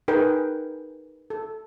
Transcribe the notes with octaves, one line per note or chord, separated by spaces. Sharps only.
D#4 G#4 A#4 B4 G5
A4